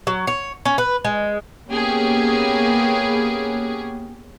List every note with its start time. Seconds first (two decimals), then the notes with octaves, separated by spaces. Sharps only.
0.07 F#3
0.27 C#5
0.65 C#4
0.78 B4
1.05 G#3
1.70 A#3 B3 C#4 G4 G#4